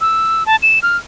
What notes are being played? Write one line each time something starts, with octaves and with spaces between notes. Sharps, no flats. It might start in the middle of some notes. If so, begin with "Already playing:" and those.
E6
A5
E7
F6